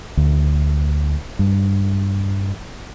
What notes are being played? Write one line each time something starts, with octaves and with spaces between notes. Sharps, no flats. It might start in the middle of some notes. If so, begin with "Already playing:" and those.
D2
G2